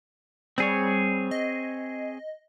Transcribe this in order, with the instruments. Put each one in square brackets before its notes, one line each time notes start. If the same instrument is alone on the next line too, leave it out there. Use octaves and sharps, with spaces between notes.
[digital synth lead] G3 [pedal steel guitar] C4 G#4 C#5
[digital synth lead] D#5